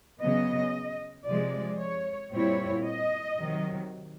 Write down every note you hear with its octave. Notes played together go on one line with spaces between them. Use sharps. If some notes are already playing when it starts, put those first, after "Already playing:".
C#3 F#3 B3 D#5
C3 F3 G#3 D5
C#5
A#2 G3 C4 E4 C#5
D#5
C3 D#3 F#3